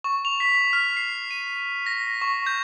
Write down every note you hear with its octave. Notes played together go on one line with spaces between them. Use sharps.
C#6
F7
B6
F6
C7
D#7
A#6
C#6
G6